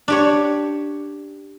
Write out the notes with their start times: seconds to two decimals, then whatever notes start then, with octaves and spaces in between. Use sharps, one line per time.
0.08 D4 G4 C#5